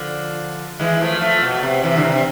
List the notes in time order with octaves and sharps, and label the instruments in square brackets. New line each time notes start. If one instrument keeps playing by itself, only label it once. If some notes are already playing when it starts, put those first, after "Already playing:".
Already playing: [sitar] D3 F3
E3 G#3
F3 A3
F3 A3
B2
C3
C3 E3
D3
C3